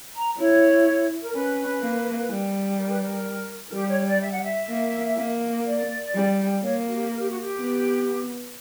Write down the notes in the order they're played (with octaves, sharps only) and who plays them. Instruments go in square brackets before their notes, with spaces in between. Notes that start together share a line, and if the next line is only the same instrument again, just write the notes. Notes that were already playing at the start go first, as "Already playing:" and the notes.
[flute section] A#5
[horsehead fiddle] E4 [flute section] C#5
[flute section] A#4
[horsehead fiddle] C#4 [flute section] B4
[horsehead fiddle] A#3
G3
[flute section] A#4
B4
A#4
A#4
[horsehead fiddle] G3 [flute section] G4
[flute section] C#5
D5
E5
F#5
E5
[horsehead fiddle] A#3
A#3
[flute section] D5
[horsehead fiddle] G3
[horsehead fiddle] A#3 [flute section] C#5
[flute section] F#4
G4
A#4
G4
F#4
G4
[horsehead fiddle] B3